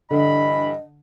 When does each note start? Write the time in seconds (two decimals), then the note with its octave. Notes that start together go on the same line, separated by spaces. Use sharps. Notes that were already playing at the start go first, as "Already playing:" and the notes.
0.11 G2 D3 E3 D#5 B5